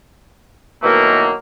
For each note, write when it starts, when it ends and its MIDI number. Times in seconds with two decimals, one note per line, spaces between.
0.83 1.32 47
0.83 1.32 51
0.83 1.32 52
0.83 1.32 54
0.83 1.32 57
0.83 1.32 58